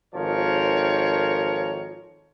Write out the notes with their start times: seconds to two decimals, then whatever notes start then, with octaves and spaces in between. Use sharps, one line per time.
0.15 G#1 D#3 F3 A4 A#4 C#5